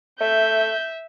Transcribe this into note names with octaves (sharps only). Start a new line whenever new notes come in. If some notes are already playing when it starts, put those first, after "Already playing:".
A3 E5 G6